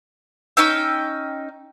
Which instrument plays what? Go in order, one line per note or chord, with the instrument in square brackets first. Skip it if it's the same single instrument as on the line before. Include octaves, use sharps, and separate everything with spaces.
[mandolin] C#4 D#4 G5 E6